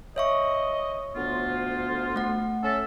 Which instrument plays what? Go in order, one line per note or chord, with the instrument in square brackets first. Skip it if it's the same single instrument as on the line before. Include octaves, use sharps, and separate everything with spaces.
[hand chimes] C#5 E5 C#6 [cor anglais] D#5
[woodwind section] D2 B3 F4
[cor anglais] C5
[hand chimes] A3 F#5
[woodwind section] C#4 A4 [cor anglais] E5